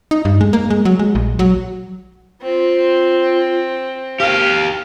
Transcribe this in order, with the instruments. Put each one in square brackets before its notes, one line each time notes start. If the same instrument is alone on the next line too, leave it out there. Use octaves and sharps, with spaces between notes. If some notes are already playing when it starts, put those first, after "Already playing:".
[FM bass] D#4
G2
G#3
A#3
G#3
F#3
G#3
A#1
F#3
[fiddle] C4 [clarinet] F4
[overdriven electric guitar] G4 A#4 [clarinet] F5